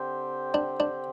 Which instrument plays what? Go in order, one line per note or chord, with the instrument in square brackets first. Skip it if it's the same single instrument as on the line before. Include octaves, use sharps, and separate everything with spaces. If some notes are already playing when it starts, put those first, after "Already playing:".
Already playing: [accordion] D3 C4 G4 C5
[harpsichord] D4
D4